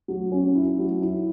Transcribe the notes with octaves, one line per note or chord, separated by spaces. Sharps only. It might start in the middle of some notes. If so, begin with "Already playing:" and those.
F#3
C#4
E4
F#3
E4